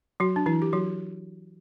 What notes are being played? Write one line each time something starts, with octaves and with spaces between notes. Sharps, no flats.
F#3 F#4
D4
E3 E4
G4
F#3 F#4